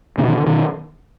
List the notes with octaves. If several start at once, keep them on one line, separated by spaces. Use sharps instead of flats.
B2 D3
D#3
D3
B2 D#3